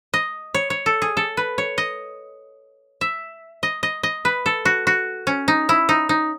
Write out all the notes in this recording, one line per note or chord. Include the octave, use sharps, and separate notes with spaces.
D#5
C#5
C#5
A4
G#4
A4
B4
C#5
D#5
E5
D#5
D#5
D#5
B4
A4
F#4
F#4
C#4
D#4
E4
D#4
D#4